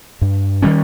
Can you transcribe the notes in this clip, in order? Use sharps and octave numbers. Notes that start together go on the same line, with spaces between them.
G2
D#3 G3 C#4